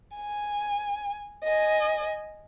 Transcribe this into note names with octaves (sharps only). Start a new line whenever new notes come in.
G#5
D#5 G#5